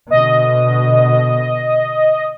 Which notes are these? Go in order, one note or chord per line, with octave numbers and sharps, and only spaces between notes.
B2 D3 D#5